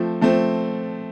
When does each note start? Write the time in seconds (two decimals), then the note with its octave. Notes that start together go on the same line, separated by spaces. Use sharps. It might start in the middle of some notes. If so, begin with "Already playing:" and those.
Already playing: F3 A3 C4
0.21 F3 A3 C4